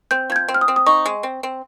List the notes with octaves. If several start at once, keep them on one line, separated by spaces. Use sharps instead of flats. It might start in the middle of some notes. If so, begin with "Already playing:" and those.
C4 G6
F3 G#6
G6
C4
F6
D#6
C4
D#6
D#4 C#6
G#3
C4
C4